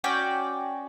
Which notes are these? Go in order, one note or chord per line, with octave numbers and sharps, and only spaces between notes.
C#4 F#4 D5 G5